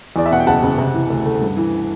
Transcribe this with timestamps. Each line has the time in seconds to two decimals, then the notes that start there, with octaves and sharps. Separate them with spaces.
0.16 E2 D5
0.26 E5
0.31 B2 F#5
0.40 G5
0.47 F#1 F#5 A5
0.63 F#1
0.78 C3
0.94 E3
1.10 D2
1.26 A3
1.41 G2
1.57 E3